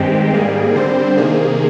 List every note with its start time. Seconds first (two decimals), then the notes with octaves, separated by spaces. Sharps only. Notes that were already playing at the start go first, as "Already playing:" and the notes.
Already playing: G2 D#3 G#3 C4 G4
0.34 G#2 G3 A#3 G#4
0.76 D3 G3 C4 C5
1.17 C3 D#3 A#3 G#4